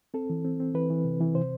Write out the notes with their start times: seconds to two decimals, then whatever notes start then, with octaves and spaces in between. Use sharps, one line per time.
0.14 C4 A4
0.30 E3
0.45 C4
0.60 C4
0.74 E3 B4
0.90 E3
1.05 C3
1.20 E3
1.35 C3 C5